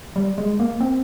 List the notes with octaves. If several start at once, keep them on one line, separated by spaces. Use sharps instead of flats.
G3
G#3
A#3
C4